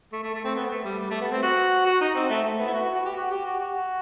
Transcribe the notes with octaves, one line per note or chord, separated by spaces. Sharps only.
A3
A3
A3
C4
B3
A3
G3
G3
A3
B3
C4
F#4
F#4
D#4
C4
A3
A3
B3
E4
F#4
F#4
F#4
G4
F#4
G4
F#4
F#4